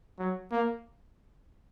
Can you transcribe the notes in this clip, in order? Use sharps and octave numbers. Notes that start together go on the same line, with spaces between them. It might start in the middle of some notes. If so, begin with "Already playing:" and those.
F#3
A#3